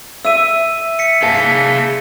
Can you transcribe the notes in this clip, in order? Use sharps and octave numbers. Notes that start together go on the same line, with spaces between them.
E5 E6 D#7
B6 C#7
G#4 F5 A5